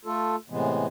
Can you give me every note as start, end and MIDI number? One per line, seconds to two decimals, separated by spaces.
0.05 0.36 57
0.05 0.36 65
0.05 0.36 69
0.50 0.87 45
0.50 0.87 48
0.50 0.87 52
0.50 0.87 56
0.50 0.87 59